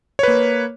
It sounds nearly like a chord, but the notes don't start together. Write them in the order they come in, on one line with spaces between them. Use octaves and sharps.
C#5 B4 A#3